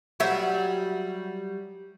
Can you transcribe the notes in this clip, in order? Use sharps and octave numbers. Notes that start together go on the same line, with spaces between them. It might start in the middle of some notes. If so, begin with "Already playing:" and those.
F#3 G3 E5